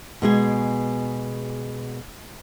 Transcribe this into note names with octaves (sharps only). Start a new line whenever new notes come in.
B2 G#3 G#4